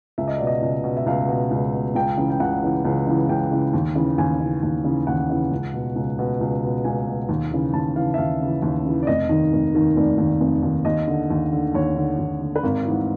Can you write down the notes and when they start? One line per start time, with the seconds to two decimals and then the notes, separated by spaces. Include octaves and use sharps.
0.18 C#2 E5
0.28 D#5
0.37 B2 D5
0.47 D#5
0.62 C#2
0.84 B2
0.97 E5
1.06 C#2 F5
1.28 B2
1.51 C#2
1.73 B2
1.95 C#2 G5
2.18 C#3 E3
2.30 G5
2.40 C#2 F#5
2.63 C#3 E3
2.85 C#2
3.07 C#3 E3
3.29 C#2 G5
3.51 C#3 E3
3.74 D#2
3.96 C#3 E3
4.18 D#2 G#5
4.40 C#3 E3
4.63 D#2
4.84 C#3 E3
5.07 D#2 F#5
5.30 C#3 E3
5.51 C#2
5.74 B2
5.96 C#2
6.19 B2
6.41 C#2
6.63 B2
6.84 C#2 G#5
7.08 B2
7.29 D#2
7.51 C#3 E3
7.74 D#2 A5
7.96 C#3 E3 F5
8.14 E5
8.18 D#2 F5
8.41 C#3 E3
8.62 D#2
8.85 C#3 E3
9.03 D5
9.07 F1 D#5
9.29 D#2 D#3
9.52 F1
9.75 D#2 D#3
9.96 F1 D5
10.18 D#2 D#3
10.40 F1
10.63 D#2 D#3
10.85 D#2 D#5
11.08 D3
11.30 D#2
11.52 D3
11.75 D#2 C#5
11.97 D3
12.19 D#2
12.41 D3
12.56 B4
12.63 G#1 A#4
12.85 G#2 E3